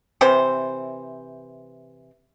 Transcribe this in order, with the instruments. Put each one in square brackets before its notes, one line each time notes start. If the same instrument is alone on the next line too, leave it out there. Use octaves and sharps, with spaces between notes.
[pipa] C3 E3 C5